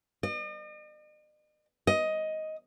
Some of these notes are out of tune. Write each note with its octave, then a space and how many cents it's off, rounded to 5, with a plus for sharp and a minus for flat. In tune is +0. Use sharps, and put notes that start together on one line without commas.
D#5 -45
D#5 +10